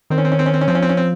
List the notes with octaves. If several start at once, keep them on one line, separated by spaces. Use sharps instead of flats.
D#3 C4
C#4
C4
C#4
C4
C#4
C4
C#4
F3 C4
C#4
C4
C#4
C4